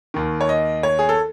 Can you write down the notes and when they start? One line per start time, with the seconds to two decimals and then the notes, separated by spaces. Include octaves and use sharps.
0.14 D#2 D#3
0.41 C#5
0.49 D#5
0.83 C#5
0.99 G#4
1.09 A4